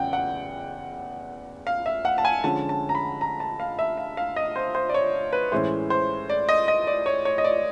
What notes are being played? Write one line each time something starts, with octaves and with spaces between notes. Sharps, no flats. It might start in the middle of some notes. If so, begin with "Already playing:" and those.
Already playing: E2 C#3 F#3 F#5 G5
F#5
F5
E5
F#5
A5
G#5
D3 F3 G#3 C#4 A5
A5
A#5
B5
A#5
A5
F5
E5
F5
F5
D#5
C5
C5
D5
C#5
B4
A2 E3 G#3 C#4 C5
C5
D5
D#5
D#5
D5
C#5
C#5
D#5
D5